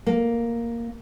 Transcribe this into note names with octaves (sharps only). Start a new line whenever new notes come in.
A#3